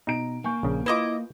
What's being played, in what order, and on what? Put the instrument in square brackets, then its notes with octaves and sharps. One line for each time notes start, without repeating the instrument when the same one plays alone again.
[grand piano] B2 A#5 D7 [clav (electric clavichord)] D#4
[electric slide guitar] A#3 [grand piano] G#5 C#6 G6
[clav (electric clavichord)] A#1 C#3
[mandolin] E4 D#5 D6 [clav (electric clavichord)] F4 B4